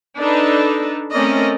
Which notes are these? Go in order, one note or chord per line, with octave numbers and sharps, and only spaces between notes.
D4 D#4 A4 B4
A3 C4 C#4 A#4 D5 D#5